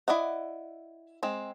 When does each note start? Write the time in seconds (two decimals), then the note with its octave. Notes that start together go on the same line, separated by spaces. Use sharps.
0.08 E4 D5 D#5 F#5
1.23 G#3 C4